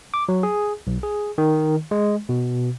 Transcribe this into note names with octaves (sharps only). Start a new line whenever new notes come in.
D6
F#3
G#4
B1
G#4
D#3
G#3
B2